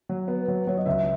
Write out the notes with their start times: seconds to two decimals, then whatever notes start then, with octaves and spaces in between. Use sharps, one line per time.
0.09 F#3
0.28 B3
0.48 F#3
0.67 F#3 C#5
0.77 D#5
0.86 C#2 E5